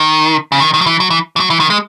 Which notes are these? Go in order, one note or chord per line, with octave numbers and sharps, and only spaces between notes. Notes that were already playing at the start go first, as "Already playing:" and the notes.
Already playing: D#3
C#3
D#3
D#3
F#3
E3
F#3
E3
E3
F#3
E3
D#3
G#3